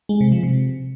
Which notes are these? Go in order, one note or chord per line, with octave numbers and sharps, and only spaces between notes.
G#3
C3
F3
C3